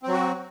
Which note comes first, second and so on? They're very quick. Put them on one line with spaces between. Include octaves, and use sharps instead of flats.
C4 F#3 F#4